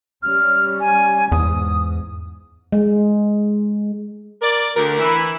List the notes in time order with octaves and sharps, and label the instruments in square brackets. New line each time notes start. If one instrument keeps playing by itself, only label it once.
[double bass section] G3 C#4 [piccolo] F6
[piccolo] G#5
[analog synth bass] E2 [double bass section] G#2 [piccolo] D#6
[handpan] G#3
[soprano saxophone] A#4 [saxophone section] D5
[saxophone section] D2 [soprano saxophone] A#4
[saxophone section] E3 E4